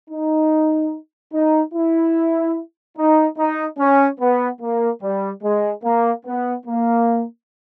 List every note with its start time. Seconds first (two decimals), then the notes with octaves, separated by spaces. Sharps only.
0.10 D#4
1.33 D#4
1.74 E4
2.98 D#4
3.38 D#4
3.79 C#4
4.20 B3
4.62 A#3
5.02 G3
5.43 G#3
5.84 A#3
6.26 B3
6.66 A#3